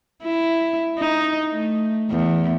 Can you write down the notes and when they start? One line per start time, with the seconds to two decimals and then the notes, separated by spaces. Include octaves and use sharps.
0.23 E4
0.98 D#4
1.52 A3
2.10 E2